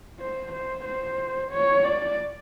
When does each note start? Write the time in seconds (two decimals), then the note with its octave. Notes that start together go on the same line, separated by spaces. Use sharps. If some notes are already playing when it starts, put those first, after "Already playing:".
0.20 C5
0.53 C5
0.85 C5
1.52 C#5
1.85 D5